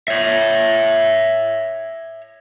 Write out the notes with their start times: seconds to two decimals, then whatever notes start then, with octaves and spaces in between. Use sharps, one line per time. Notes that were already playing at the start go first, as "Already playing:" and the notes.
0.08 C#5 E5